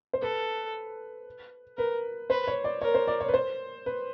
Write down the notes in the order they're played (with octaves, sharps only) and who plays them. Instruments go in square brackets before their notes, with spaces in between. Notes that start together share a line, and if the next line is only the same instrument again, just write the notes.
[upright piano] C5
[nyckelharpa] A4 [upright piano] B4
[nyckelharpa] A#4 [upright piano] B4
[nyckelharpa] B4 [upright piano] C5
[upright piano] C#5
D5
[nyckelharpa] A#4 [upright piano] C#5
[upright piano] C5
D5
C#5
B4
C5
B4